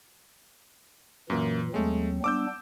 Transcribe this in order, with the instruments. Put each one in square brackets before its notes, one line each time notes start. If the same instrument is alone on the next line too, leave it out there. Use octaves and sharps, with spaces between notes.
[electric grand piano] F#2 A#3 [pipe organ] A#2 E3
[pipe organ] D#2 F#3 C4 [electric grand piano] G#3 A3
[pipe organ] G3 B3 D4 [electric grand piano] D6 E6 G6